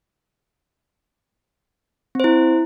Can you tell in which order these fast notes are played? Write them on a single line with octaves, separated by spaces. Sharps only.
C4 C5 E4